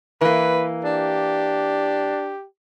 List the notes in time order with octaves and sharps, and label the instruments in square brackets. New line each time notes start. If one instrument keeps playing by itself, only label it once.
[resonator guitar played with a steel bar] E3 A#3 [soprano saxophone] B4
[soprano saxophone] D4 [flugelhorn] G4